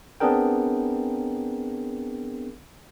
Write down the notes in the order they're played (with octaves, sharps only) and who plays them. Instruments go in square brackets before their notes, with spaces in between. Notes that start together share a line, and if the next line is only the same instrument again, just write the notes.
[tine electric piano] B3 C4 D4 G#4 A#4 G5